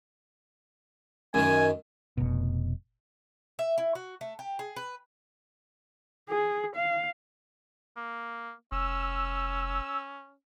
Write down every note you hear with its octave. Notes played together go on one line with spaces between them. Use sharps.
F#2 D#3 G#5
F1 B2
E5
E4
F#4
A3
G4
G#4
B4
G#4
F5
A#3
F1 C#4 E6